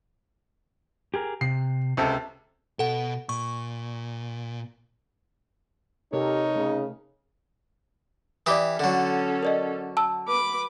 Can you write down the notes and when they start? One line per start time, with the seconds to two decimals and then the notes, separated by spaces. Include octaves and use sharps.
1.14 G4 G#4 A#4
1.41 C3 C7
1.97 C#2 C3 A4
2.79 B2 A4 F#5
3.29 A#2 C#6
6.13 C3 D#4 G4 A4 A#4 C#5
6.56 C#3 A3
8.46 E3 G4 D5 D6 D#6
8.79 D3 F#3 C#4 A4
9.43 A#4 D5 D#5
9.97 A5 E6
10.28 B4 D6